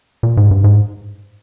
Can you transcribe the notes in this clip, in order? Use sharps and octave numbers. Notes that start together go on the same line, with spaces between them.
A#2
G#2
G2
G#2